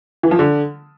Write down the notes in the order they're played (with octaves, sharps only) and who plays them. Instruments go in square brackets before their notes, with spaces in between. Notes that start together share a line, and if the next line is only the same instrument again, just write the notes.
[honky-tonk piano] E3
F3
D3